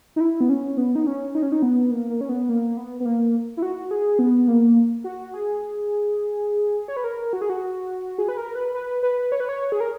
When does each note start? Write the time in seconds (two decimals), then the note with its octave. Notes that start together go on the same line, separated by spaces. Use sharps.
0.16 D#4
0.20 E4
0.41 B3
0.50 C#4
0.77 B3
0.95 D#4
1.07 C#4
1.35 D#4
1.43 C#4
1.52 D#4
1.62 B3
1.91 A#3
2.10 A#3
2.21 C#4
2.29 B3
2.49 A#3
2.77 B3
3.00 B3
3.05 A#3
3.57 E4
3.62 F#4
3.91 G#4
4.19 B3
4.48 A#3
5.04 F#4
5.34 G#4
6.88 C#5
6.97 B4
7.04 A#4
7.33 F#4
7.42 G#4
7.50 F#4
8.18 G#4
8.28 B4
8.37 A#4
8.55 B4
8.75 B4
9.03 B4
9.32 C#5
9.40 B4
9.49 C#5
9.72 G#4
9.80 A#4